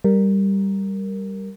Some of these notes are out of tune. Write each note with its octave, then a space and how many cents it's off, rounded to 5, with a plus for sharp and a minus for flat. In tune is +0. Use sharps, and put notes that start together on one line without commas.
G3 +0 A#4 -5